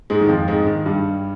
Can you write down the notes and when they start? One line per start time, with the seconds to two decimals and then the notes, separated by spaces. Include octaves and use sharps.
0.10 G#2 G#3
0.20 D#3
0.29 F2 F3
0.48 G#2 G#3
0.67 D#3
0.86 G2 G3